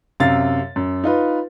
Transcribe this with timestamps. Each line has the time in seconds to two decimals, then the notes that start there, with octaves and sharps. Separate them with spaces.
0.20 F#2 C3 F5 A6
0.76 F#2
1.04 D#4 F4 B4